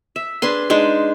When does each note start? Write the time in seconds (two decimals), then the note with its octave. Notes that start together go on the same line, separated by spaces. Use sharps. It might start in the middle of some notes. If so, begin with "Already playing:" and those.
0.16 E5
0.42 D4 G#4 B4 C6
0.70 G#3 D4 D#4